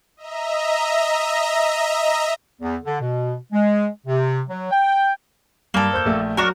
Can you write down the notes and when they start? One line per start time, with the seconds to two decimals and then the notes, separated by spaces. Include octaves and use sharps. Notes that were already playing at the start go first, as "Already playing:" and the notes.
0.17 D#5 E5 A#5
2.61 E2
2.84 D3
3.01 B2
3.53 G#3
4.07 C3
4.49 F#3
4.71 G5
5.74 G2 A#3 A4
5.93 C5 G6
6.05 A#1 A3
6.37 F#3 D4 F#4 A#4